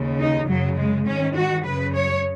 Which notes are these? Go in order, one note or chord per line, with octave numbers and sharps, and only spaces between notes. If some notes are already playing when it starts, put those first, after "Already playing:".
Already playing: D#2 C#3
D#4
F#2 C#3 F#3
G#3
G#2 D#3 C#4
F#4
F#2 C#3 B4
C#5